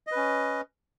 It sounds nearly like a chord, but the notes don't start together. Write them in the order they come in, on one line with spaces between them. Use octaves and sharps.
D#5 B4 C#4